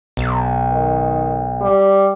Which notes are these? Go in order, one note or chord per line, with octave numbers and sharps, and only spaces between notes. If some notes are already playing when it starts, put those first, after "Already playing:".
B1
D#3
G3